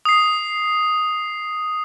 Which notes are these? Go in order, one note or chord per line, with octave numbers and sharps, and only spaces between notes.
D#6 C7